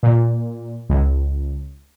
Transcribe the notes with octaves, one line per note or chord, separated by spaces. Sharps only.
A#2
C#2